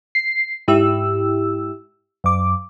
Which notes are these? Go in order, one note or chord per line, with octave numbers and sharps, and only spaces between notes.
C7
G#2 E4 G4 E6
F#2 D6